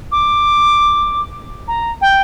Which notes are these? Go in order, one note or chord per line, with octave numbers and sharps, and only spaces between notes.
D6
A#5
G5